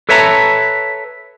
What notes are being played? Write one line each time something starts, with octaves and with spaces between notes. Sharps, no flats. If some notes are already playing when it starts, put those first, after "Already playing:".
A4 B4 C#5 E5 A5 A#5